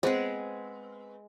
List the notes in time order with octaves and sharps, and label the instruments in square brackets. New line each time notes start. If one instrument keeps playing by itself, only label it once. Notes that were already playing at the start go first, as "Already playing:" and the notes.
[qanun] G#3 G#4 [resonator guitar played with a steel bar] B3 C4 [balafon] C5